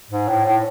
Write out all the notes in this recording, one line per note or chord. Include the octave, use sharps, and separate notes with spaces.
G#2
A2
A2